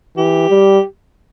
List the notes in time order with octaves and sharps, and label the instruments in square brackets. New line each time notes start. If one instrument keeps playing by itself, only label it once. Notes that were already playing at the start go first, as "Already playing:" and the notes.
[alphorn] E3 [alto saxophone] G4
[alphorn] G3